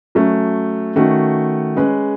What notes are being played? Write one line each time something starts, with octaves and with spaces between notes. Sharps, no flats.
F#3 A3 C#4
D#3 A3 C#4 F#4
G#3 C#4 G#4 B4